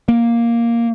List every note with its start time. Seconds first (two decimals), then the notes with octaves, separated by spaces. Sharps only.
0.08 A#3